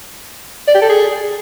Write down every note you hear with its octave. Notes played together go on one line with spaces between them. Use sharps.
D5
G4
A4
G#4